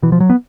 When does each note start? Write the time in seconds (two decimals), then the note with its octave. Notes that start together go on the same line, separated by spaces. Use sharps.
0.02 B2 E3
0.12 F3
0.20 F#3
0.30 B3